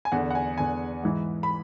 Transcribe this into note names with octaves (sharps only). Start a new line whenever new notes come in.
G#5
E2 D3 F#5
F#5
G#5
E2 D3 G#5
G#2 E3
B5